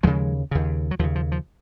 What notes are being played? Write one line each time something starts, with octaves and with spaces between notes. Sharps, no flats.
D#2 C#3 F3 G#3
D#2 C#3
F#3
D#2 C#3 F3
F3
F3